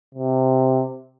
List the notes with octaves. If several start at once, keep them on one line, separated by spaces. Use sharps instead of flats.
C3